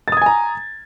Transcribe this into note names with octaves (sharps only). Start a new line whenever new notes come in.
G#5 A#5 D#6 G#6 A6